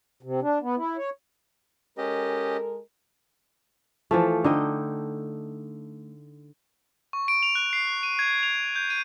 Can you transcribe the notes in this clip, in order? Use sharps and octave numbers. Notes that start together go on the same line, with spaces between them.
C3
D4
B3
E4
C#5
G#3 C#4 G4 A4 A#4 D#5
E3 F3 A3
D3 D#4 D#5 G5
C#6
D7
F7
F#6
C7
F#6
D#7
G#6
F7
G6
D#7